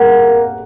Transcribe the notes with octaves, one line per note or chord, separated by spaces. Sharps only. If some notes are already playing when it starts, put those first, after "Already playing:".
Already playing: A#3 F#5